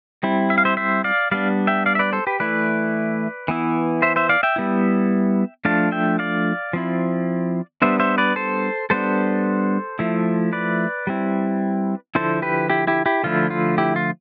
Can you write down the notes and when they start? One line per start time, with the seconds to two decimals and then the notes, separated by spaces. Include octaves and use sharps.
0.23 G3 C4 E4
0.50 E5
0.58 F5
0.65 C5 E5
0.77 C5 E5
1.04 D5 F5
1.31 G3 B3 D4 D5 F5
1.67 E5 G5
1.86 D5 F5
1.95 E5
1.99 B4 D5
2.13 A4 C5
2.27 G4 B4
2.40 E3 A3 E4 B4 D5
3.48 E3 B3 E4
4.02 C5 E5
4.16 C5 E5
4.29 D5 F5
4.43 E5 G5
4.56 G3 B3 E4
5.65 F3 A3 D4 F5 A5
5.92 E5 G5
6.19 D5 F5
6.73 F3 C4 E4
7.82 G3 B3 D4 C5 E5
8.00 C5 E5
8.18 B4 D5
8.36 A4 C5
8.90 G3 B3 D4 A4 C5
9.99 F3 A3 E4
10.53 B4 D5
11.07 G3 C4 E4
12.15 D3 F3 C4 E4 A4 C5
12.42 G4 B4
12.70 E4 G4
12.87 E4 G4
13.06 E4 G4
13.24 D3 F3 A3 E4 F4
13.50 F4
13.78 E4 G4
13.96 F4